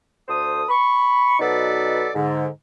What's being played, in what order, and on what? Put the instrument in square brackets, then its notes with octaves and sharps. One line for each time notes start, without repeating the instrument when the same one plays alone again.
[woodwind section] D2 A4 C5 D#6
B5 C#6
B2 F#3 D#4 A4 B4 D5
G#2 D3